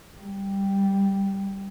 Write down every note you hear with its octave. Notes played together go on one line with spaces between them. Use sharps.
G3